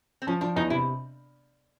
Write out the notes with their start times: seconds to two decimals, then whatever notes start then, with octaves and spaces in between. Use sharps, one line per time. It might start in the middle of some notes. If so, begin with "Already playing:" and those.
0.22 C4
0.27 F3 C#4
0.41 F3 D4
0.56 E2 D#4
0.70 C3 E4